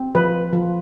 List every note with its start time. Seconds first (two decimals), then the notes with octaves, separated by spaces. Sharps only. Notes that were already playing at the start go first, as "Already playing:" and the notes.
Already playing: C4
0.15 F3 B4
0.53 F3